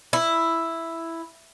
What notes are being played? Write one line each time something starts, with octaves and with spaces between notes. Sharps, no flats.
E4